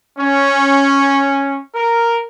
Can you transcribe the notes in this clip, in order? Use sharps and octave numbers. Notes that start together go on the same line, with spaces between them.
C#4
A#4